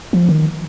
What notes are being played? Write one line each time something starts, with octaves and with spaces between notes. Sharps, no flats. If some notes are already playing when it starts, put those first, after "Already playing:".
F3
D#3